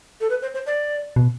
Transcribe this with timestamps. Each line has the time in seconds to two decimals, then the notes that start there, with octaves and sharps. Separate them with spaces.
0.21 A4
0.30 B4
0.42 C5
0.54 C5
0.66 D5
1.16 B2